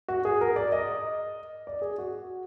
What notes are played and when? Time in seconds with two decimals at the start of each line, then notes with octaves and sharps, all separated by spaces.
0.08 F#4
0.25 G#4
0.41 A#4
0.56 D5
0.72 D#5
1.67 D5
1.82 G#4
1.98 F#4